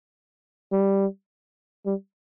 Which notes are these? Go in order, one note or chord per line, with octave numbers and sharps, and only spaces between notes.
G3
G3